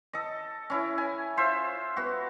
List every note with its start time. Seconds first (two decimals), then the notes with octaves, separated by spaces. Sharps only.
0.13 A4 D#5
0.70 C#4 E4
0.98 G#5
1.37 F4 C5 E5
1.97 B3 F#4